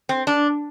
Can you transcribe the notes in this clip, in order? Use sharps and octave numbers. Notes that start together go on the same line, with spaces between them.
C4
D4